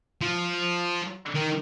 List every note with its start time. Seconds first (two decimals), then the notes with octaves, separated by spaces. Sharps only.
0.21 F3
1.35 D#3